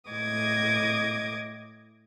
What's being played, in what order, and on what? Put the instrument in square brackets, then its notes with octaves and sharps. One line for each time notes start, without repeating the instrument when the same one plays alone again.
[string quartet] A2 D#5 D6 D#6 G#6